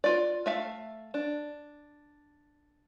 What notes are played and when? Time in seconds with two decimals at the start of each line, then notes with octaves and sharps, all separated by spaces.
0.04 F4 D5
0.46 A3 E5 F5
1.14 D4